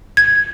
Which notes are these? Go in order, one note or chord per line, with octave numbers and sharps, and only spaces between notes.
G#6